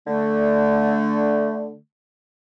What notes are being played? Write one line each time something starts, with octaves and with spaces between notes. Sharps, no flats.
D3 A3